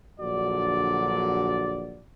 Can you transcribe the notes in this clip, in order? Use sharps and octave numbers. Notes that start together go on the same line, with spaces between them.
A#1 D3 F#3 F#4 D5